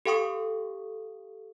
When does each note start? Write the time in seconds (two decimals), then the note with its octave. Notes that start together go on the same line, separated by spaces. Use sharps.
0.06 G4 A4 F5 G5 C#6 D#6